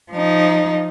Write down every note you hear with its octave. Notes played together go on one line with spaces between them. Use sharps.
F3 D#4